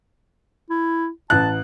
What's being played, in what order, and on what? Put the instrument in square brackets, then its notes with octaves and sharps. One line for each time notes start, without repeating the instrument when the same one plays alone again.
[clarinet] E4
[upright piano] A1 F#6 [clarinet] A5